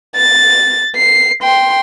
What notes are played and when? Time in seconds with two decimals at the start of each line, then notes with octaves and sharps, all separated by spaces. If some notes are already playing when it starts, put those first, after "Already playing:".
0.16 A6
0.97 C7
1.43 G5 C6